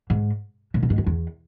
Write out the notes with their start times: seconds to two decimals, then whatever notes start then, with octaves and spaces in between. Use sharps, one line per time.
0.10 G#2
0.74 A2
0.83 B2
0.90 G#2
0.98 F#2
1.06 E2